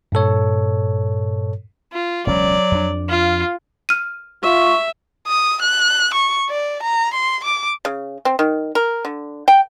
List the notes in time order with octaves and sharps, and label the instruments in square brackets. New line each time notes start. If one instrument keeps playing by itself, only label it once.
[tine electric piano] G2 A#2 A4 C#5
[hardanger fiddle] F4
[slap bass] E1 C#2 C#4 [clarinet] F#3 [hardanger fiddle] D5
[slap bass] F2 D4
[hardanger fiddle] F4 [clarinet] F5
[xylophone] F6 D#7
[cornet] F4 [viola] E5 [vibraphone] C#6
[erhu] D#6
F#6
C#6
D5
A#5
C6
D6
[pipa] C#3
C4
D#3
A#4
D3
G5